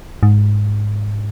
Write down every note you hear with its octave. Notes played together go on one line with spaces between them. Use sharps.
G#2